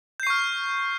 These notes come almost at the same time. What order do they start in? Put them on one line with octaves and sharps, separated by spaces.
G6 C7 C#6 F6